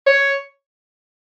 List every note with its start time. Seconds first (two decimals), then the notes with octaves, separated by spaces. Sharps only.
0.07 C#5